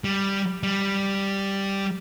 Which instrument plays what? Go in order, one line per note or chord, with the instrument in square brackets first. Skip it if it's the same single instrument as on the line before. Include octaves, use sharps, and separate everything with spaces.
[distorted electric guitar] G3
G3